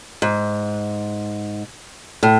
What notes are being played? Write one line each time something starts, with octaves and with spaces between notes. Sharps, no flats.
G#2
A2